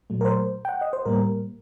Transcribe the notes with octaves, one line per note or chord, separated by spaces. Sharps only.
A#2 F#3 A3
A#4
C5
G5
F#5
D#5
C5
A2 G3 A#3 A#4